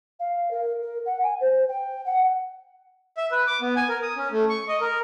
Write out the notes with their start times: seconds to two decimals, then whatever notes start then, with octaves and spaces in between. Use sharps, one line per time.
0.19 F5
0.51 A#4
0.82 A#4
1.05 F#5
1.22 G#5
1.40 C5
1.68 G5
2.05 F#5
3.17 E5
3.32 B4
3.47 D6
3.61 B3
3.76 G#5
3.89 A#4
4.02 D#6
4.16 C#4
4.31 A3
4.50 C#6
4.68 D#5
4.81 A#4